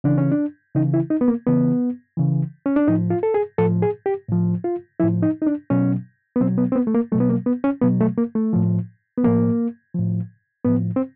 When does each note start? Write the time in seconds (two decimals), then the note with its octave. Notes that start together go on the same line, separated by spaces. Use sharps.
0.04 C#3 E3 D4
0.18 C#4
0.32 D4
0.75 C#3 E3 D#4
0.94 E4
1.10 D#4
1.21 B3
1.28 A#3
1.46 C#3 E3 B3
2.17 C#3 E3
2.66 C#4
2.76 D4
2.87 A2 F3 D#4
3.10 F4
3.23 A4
3.34 G#4
3.58 A2 F3 A4
3.82 G#4
4.06 G4
4.28 A2 F3
4.64 F4
5.00 A2 F3 E4
5.22 D#4
5.42 D#4
5.47 D4
5.70 B2 F#3 C#4
6.36 B3
6.41 B2 F#3 C4
6.58 B3
6.72 C4
6.76 B3
6.87 A3
6.95 A#3
7.12 F#3 A3
7.15 B2
7.20 B3
7.30 A#3
7.46 B3
7.64 C#4
7.82 B2 F#3 B3
8.01 A3
8.17 A#3
8.35 A3
8.53 A2 F3
9.17 B3
9.24 A2 F3 A#3
9.95 A2 F3
10.65 A2 F3 B3
10.96 C4